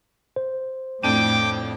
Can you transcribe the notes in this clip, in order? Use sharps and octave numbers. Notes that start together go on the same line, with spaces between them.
C5
F2 A2 D4 G5 D6 D#7